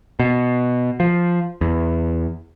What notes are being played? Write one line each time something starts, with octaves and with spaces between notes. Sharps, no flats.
B2
F3
E2